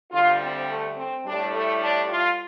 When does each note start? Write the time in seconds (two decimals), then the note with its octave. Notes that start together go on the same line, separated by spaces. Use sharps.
0.12 D2 D3 G3 F4
0.41 C4
0.69 A3
0.97 C4
1.26 A2 G3 D4
1.54 A3
1.82 D4
2.10 F4